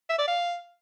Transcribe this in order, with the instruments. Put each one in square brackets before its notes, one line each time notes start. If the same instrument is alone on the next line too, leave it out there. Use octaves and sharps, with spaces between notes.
[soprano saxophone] E5
D5
F5